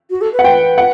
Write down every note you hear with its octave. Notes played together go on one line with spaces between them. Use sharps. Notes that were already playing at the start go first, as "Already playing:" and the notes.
F#4
A4
B4
F#5
G5
F#5